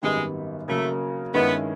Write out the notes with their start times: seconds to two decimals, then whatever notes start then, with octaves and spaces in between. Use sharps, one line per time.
0.03 G#1 F#2 D#3 G3 G#3 B3
0.68 C#3 F#3 A3 A#3
1.34 G2 D#3 G#3 B3 C#4 E4